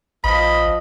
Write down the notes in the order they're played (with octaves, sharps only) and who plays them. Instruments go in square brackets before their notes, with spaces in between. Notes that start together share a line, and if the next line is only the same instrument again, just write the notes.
[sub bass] A#1 [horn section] F3 D#5 [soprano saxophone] B5